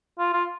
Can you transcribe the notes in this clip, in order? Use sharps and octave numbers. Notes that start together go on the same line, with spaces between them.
F4
F4